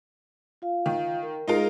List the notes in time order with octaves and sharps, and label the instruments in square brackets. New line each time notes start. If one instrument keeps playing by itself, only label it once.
[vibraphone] F4 F5
[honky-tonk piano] D#3
[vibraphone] A#4
[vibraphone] G#3 G#4 [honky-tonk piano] D#4 F4 A#4